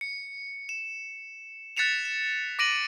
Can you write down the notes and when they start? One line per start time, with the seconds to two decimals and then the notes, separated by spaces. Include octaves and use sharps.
0.01 C#7
0.69 E7
1.77 F#6 A6 B6 C#7 E7 F7
2.05 E7
2.59 D6 A#6 D7 D#7 F#7